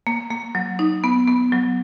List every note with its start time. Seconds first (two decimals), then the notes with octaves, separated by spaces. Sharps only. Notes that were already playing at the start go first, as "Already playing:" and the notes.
0.07 A#3
0.31 A#3
0.55 F#3
0.79 D#4
1.04 B3
1.28 B3
1.52 F#3